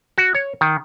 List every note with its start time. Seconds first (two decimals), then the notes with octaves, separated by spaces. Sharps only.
0.18 F#4
0.35 C#5
0.61 D#3